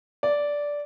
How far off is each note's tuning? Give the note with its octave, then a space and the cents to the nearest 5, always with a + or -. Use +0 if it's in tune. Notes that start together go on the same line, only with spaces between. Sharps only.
D5 -10